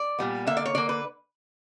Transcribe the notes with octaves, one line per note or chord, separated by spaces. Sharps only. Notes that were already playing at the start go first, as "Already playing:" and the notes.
Already playing: D5
A#2 G3 B3
D3 A#3 E5
D5
C#5
D3 A#3 D5
B4